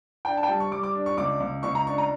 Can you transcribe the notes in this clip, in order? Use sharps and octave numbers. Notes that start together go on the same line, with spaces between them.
D4 G5
A5
G5
G3 A5
C#6
G3 D6
D6
D4
C#6
C#2 D6
C#2
C#2 C#6
A#5
D4 C#6
A#5